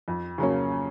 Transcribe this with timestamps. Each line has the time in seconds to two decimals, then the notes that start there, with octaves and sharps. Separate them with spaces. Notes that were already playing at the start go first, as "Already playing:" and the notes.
0.08 F2
0.38 C#3 F#3 A#3 C#4